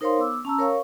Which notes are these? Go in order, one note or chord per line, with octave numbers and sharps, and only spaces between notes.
D#4 A#4 C5 C#5 F5 C6
B3 D6 E6
C#4 A5 A#5 E6
A#4 C#5 F5 C#6